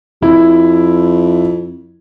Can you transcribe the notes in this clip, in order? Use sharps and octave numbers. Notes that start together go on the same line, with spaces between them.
F2 E4